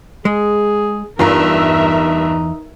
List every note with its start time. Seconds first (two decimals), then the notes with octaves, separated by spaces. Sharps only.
0.25 G#3 G#4
1.19 E2 G2 D#4 F4 A#4 E5 A#5